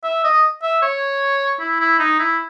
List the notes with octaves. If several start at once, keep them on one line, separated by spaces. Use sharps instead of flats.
E5
D#5
E5
C#5
E4
E4
D#4
E4